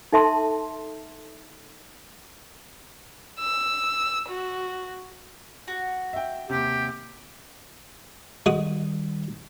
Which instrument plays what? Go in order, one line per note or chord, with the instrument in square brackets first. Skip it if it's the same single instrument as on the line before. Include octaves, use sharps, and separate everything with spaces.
[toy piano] D#4 A4 E5 A5 C6
[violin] E6
F#4
[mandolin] F#4
[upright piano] E5 G5
[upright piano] D#2 C3 [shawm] G4
[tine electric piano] D#3 G3 [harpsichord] G#3 F#4 D#6